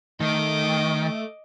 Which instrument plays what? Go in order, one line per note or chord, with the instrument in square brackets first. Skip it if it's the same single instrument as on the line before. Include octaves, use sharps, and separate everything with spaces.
[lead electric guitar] D#3 [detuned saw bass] A3 [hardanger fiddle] D#5 D6